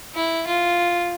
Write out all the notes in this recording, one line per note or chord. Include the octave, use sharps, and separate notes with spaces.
E4
F4